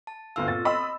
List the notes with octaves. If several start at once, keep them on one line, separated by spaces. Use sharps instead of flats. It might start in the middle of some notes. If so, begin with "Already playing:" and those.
A5
G1 D2 B3 A4 F5 E6
A#2 C4 A6
D#5 B5 C6 E6